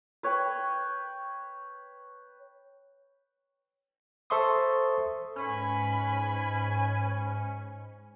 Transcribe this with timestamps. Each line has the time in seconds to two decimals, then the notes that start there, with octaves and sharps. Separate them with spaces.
0.23 B4 C#5 G5
4.30 A4 C5 E5 C6 C#6 D#6
5.36 G#2 C#4 B4 G#5 B5